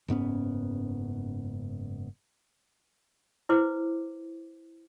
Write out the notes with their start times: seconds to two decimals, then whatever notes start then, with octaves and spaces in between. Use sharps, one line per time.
0.08 F#1 G#2 B3 C#4
3.49 E4 B4 C5 D6